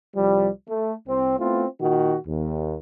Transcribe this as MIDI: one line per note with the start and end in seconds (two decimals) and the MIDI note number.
0.16 0.49 36
0.16 0.49 53
0.16 0.49 55
0.69 0.92 57
1.08 1.38 36
1.08 1.38 60
1.39 1.65 57
1.39 1.65 59
1.39 1.65 60
1.39 1.65 64
1.39 1.65 65
1.81 2.16 46
1.81 2.16 51
1.81 2.16 66
2.27 2.76 39